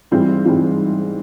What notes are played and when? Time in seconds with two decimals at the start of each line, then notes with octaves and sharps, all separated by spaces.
0.11 G#2 E3 G3 C4 F4
0.45 G#2 E3 G3 C4 F4